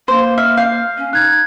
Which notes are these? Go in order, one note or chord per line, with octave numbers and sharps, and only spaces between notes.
A#3 C5
E5 F6
F5 G6 C7
C#4
D#4 F#6 G#6